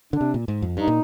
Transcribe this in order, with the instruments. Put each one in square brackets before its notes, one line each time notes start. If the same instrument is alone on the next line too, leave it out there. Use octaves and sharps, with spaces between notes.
[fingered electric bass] D3 [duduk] D4
[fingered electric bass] C3
A#2
G#2
F2
[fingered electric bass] G2 [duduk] D#4
[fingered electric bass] A#2